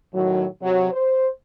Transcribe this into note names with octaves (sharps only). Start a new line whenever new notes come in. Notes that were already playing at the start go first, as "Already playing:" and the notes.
A2 D#3 F#3
C3 F#3
C5